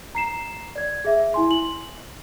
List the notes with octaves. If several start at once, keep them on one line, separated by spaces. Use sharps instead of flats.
A#5 C7 E7
D5 G#6
G#4 E5
E4 G#5 C6
F#7